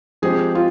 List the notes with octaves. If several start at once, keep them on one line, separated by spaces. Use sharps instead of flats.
F3 G#3 C4 G4 G#4
F4